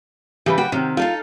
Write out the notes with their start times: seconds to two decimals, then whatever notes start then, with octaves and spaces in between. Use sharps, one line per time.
0.46 C#3 E3 G3 G4 B4
0.58 F#4 G5
0.72 C3 D#3 G4
0.97 D#4 F4 A4 F5